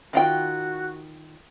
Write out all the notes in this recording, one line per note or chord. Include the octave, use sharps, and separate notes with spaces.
D#3 F4 F#4 G5